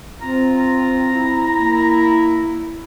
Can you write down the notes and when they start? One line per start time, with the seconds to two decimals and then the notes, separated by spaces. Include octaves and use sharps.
0.21 C4 F4 A#5
0.58 A#5
1.13 E4
1.57 A#3